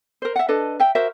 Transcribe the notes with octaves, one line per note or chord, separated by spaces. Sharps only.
A#4 C5
E5 F#5
D4 A4 B4 D#5
E5 G5
F#4 A#4 C5 E5